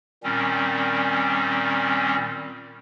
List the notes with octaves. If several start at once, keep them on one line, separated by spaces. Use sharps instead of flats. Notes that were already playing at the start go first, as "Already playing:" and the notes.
A#2 D#3 G3 C4 C#4